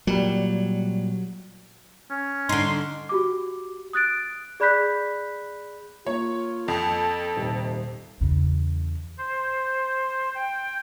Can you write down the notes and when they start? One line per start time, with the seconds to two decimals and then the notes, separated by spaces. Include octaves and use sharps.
0.07 A#2 F#3 G3
2.10 C#4
2.49 D3 D#4 C6
3.09 F#4 G4 D6
3.93 D#6 F#6 A6 D7
4.60 G#4 D5 B5 F#6 G6 B6
6.07 A#3 F4 C#5
6.68 F2 A4
7.37 D#1 C3
8.21 E2 C#3
9.18 C5
10.35 G5